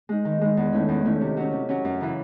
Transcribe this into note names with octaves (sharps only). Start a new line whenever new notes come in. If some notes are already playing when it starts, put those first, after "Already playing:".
G#3 D#4
D#3
G#3 D#4
E2
D#3 A3 C#4 E4
E2
D#3 A3 C#4 E4
C3
F#3 C#4
C3
F#3 C#4
F#2
C#3 E3